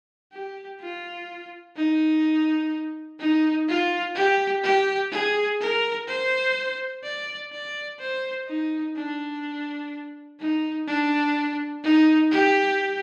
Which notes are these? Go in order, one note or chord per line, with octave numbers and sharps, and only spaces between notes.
G4
F4
D#4
D#4
F4
G4
G4
G#4
A#4
C5
D5
D5
C5
D#4
D4
D#4
D4
D#4
G4